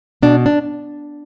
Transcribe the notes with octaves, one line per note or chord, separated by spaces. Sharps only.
B2 D4
D4